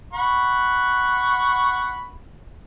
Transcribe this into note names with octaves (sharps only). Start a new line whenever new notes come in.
F#5 B5 C#6